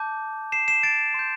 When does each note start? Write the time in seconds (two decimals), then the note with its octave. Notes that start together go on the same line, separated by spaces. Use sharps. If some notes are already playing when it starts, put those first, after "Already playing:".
Already playing: A5 D6 G6
0.52 C7 E7
0.68 C7 E7
0.83 A6 D7
1.14 C6 G6